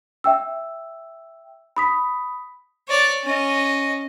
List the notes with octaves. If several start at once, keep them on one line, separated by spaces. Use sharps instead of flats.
E5 G5 E6
B5 D#6 B6
C#5 D5
C#4 D#5